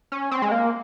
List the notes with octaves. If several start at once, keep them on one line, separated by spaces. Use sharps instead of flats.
C#4
C4
G#3
A#3